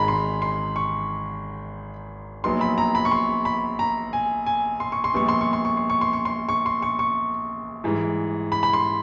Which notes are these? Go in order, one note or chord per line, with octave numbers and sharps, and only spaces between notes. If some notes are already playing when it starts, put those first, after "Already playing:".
Already playing: G#1 G#2 D#3 G#3 A#5 B5
C6
C6
C#6
A#1 A#2 F#3 B3 D#4 C6
B5
A#5
B5
C#6
C6
B5
A#5
G#5
G#5
C6
C#6
C6
A#1 A#2 G3 B3 C#6
C6
C#6
C6
C#6
C6
C#6
C6
C#6
C6
C#6
C6
C#6
C#6
G#2 E3 G3
B5
B5
C6